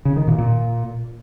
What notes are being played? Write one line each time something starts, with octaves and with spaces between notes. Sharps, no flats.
C#3
D#3
A#2
A#2